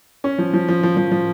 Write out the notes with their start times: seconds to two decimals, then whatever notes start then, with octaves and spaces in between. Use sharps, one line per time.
0.24 C#4
0.38 F3
0.54 F3
0.69 F3
0.83 F3
0.97 F3
1.12 F3